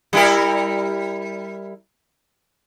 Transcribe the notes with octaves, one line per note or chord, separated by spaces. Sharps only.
G3 E4 A#4